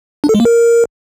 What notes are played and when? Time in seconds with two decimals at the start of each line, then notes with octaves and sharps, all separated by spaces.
0.24 D4
0.29 A4
0.35 G#3
0.40 A#3
0.45 A#4